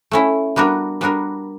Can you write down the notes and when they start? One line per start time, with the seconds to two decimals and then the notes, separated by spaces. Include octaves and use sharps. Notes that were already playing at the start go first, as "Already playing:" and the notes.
0.11 A3 C#4 E4
0.56 G3 B3 D4 F#4 A#4
1.01 G3 B3 D4 F#4 A#4